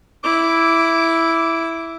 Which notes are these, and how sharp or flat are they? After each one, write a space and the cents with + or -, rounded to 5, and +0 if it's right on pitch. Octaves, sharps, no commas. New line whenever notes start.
E4 +0 D6 -10